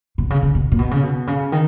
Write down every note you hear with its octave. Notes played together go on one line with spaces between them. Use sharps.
B2
C#3
C#3
B2
A#2
B2
C#3
B2
C#3
D#3